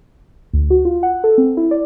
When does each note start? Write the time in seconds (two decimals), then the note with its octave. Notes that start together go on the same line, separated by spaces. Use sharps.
0.53 D2
0.70 F#4
0.85 F4
1.03 F#5
1.24 A4
1.38 C4
1.57 E4
1.71 D5